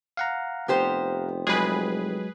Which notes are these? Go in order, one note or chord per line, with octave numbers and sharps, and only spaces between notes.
F5 F#5 A#5
F1 B3 G4 C5
F#3 G#3 G#4 B4